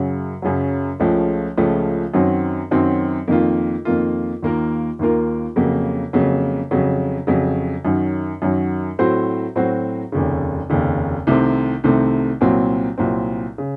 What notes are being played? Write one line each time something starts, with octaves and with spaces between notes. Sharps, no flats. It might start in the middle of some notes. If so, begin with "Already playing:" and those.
Already playing: F#2 C#3 F#3
F#2 C#3 F#3
C#2 C#3 F3 A3 C#4
C#2 C#3 F3 A3 C#4
F#2 D#3 F#3 C4
F#2 D#3 F#3 C4
F2 D#3 A#3 F4
F2 D#3 A#3 F4
D#2 D#3 A#3 F4 A#4
D#2 D#3 A#3 F4 A#4
F2 C#3 F#3 A#3
F2 C#3 F#3 A#3
F2 C#3 F#3
F2 C#3 F#3
F#2 D#3 F#3
F#2 D#3 F#3
A2 F#3 C4 F#4 C5
A2 F#3 C4 F#4 C5
F1 D#2 C#3
F1 D#2 C#3
C2 C3 D#3 A3 C4
C2 C3 D#3 A3 C4
C2 A#2 F#3 C4
C2 A#2 F#3 C4
C#3